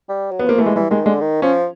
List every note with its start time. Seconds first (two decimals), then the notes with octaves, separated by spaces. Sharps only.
0.09 G3
0.31 F#3
0.39 B3
0.46 F3 A#3
0.58 E3 A3
0.66 G#3
0.76 E3 G3
0.91 D#3 G#3
1.05 D3 G#3
1.21 D#3
1.42 F3 C#4